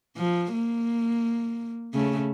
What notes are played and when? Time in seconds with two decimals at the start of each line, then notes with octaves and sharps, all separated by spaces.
0.17 F3
0.52 A#3
1.94 C#3 A3